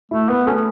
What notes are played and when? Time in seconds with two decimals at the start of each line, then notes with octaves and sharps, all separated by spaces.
0.11 A3 E4
0.29 B3 B4
0.47 A3 C#4